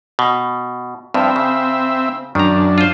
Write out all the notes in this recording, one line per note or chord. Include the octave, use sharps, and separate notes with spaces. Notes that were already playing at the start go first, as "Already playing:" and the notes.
B2
G2 F3 C4 E5
C#3
F#2 D#3 D4 A#5
F4 C5